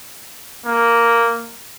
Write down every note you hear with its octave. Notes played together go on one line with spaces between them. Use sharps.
A#3